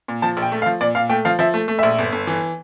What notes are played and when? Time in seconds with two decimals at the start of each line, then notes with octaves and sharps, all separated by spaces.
0.08 A#2
0.22 F3 A5
0.37 A#1
0.42 G5
0.52 A3
0.62 F5
0.66 F3
0.81 A#2 D5
0.95 A#2 F5
1.10 A3 G5
1.25 F3 F5
1.39 F3 E5
1.54 A3
1.68 A3
1.79 A#1 E5
1.98 G1
2.12 G1
2.27 E3